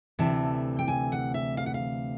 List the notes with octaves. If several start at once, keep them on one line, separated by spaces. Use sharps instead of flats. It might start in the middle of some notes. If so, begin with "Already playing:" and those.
D2 C3 E3 A3 A5
G5
G#5
F#5
E5
F5
F#5
F5